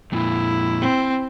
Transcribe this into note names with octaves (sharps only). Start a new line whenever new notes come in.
F2 A#2 E4
C4